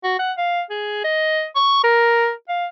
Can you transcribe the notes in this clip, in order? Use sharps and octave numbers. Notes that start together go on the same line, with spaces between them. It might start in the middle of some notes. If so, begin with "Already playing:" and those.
F#4
F#5
F5
G#4
D#5
C#6
A#4
F5